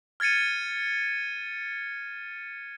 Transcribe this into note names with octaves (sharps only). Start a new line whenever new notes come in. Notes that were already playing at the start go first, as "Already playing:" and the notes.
F6 G#6 A6 C#7 D#7